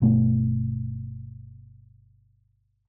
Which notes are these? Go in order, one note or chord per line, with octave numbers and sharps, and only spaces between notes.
G1 B2 A3